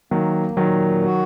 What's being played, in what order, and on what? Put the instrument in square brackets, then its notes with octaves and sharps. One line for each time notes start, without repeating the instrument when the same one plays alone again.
[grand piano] D#3 F#3 [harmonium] A#3
[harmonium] A#2 [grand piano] D#3 F#3
[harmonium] F#4